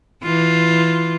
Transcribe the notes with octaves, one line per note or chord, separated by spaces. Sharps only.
E3 F4